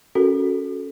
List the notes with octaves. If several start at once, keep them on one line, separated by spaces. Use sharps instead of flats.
C#4 F#4 A4 A#4